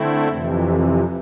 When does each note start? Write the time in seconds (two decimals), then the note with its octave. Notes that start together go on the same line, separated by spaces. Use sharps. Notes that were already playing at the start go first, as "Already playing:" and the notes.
Already playing: D3 A3 C4 E4
0.29 F2 C3 E3